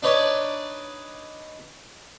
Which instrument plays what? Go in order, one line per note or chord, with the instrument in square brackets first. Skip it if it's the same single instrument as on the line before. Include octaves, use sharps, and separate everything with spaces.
[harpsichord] D4 D#4 B4 C#5 D5